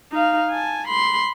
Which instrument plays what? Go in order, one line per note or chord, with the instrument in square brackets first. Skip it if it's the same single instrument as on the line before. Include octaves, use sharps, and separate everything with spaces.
[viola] D#4 F5
G#5 A5
B5 C6